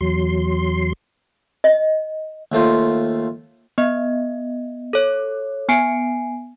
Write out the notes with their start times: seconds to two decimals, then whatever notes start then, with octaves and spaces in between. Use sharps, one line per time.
0.01 E2 F#3 C6
1.64 D#5
2.52 D#2 A3 F4 C5
3.78 B3 D#5
4.93 A4 C#5
5.69 B3 G#5 C7 D7